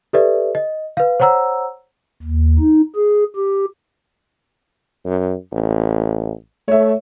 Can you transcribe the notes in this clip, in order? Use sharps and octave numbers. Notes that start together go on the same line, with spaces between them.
G4 A4 B4 D5 E5
D#5
B4 F5
C5 C#5 F#5 A#5 E6
D#2
D#4
G#4
G4
F#2
A1
A3 C#5 E5